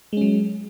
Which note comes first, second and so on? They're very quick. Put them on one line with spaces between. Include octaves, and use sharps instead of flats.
G#3 C#4 F#3